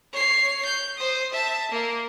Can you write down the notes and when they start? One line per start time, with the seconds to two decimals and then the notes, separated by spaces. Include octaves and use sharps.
0.13 C#5 C7
0.65 G6
0.98 C5 D#6
1.33 E5 A5
1.72 A#3